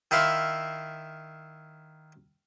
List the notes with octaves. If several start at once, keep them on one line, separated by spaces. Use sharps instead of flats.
D#3 E4 E5 F5 C6